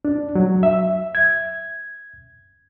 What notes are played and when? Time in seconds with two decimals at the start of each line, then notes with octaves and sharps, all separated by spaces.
0.05 D4
0.35 F#3
0.63 E5
1.15 G#6